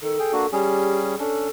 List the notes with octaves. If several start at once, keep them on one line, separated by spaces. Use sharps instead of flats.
D#3 A4
G#4 G5
A#3 D4 F#4
G3 C#4 G4 G#4
C#4 D4 A4